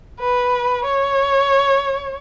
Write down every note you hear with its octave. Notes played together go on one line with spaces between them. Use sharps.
B4
C#5